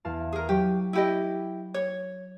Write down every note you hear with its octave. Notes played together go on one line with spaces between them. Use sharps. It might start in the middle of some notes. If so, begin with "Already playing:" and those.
E2 F5 A5
G#4 A#4
F#3 G4
E4 G4 D#5
C#5